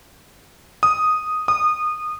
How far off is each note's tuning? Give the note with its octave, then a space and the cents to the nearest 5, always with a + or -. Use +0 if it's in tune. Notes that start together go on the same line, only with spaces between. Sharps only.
D#6 +0
D#6 -25